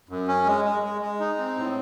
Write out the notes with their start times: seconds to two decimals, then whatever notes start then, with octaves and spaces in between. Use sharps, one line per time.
0.09 F#2
0.28 C#4
0.46 G#3
0.65 G#3
0.83 G#3
1.01 G#3
1.20 D#4
1.38 C4
1.57 A2